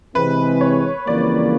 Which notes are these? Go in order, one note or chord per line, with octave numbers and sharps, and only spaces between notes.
C3 E3 G#3 C4 B4
C#5
F2 C#3 E3 G3 A#3 D5